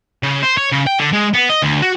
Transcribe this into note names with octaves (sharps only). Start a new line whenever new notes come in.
C#3
C5
C#5
C#3
G5
D3
G#3
B3
D#5
D2
F#4